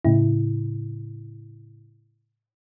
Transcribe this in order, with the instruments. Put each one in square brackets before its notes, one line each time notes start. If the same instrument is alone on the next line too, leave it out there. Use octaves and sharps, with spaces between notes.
[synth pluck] A2 C#3 E4